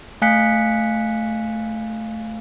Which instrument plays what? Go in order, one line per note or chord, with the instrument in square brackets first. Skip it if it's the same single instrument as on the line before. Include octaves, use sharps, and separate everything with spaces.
[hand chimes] A3 F5 G#5 F#6 B6 C#7